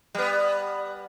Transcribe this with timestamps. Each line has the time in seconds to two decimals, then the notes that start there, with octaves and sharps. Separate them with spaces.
0.15 G3 B3